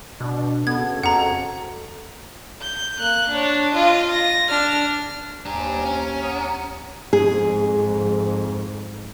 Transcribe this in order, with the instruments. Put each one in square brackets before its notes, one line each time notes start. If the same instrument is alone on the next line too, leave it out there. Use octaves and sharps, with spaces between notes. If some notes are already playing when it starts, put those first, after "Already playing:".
[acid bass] B2 [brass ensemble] D4
[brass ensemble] C#3 F#4 A4 [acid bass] B3 [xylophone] G#6
[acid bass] F2 [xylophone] F#5 A#5
[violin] G6
A#3 F#6
D4 C#5
F4 D#5
A#6
D4 F6
[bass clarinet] D#2 [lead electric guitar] D4 G4 [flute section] C5 G#5 A#5
[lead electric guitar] C#4
[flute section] F#5 A#5 D#6
[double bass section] F2 G#2 [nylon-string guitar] G#4